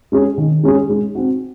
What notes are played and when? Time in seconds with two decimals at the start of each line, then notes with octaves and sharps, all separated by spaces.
0.12 G#3 C#4 G#4
0.38 D#3
0.63 G#3 C#4 G#4
0.90 G#3
1.15 C4 F#4